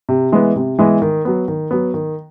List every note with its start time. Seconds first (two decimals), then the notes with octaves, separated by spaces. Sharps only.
0.09 C3
0.32 E3 G#3 B3
0.56 C3
0.79 E3 G#3 B3
1.02 D#3
1.25 F#3 B3
1.48 D#3
1.71 F#3 B3
1.94 D#3